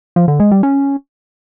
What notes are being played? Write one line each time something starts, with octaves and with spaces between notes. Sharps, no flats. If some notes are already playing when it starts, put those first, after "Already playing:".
F3
D3
G#3
G3
C#4